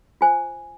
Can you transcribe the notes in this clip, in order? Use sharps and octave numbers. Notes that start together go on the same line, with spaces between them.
F4 C5 G#5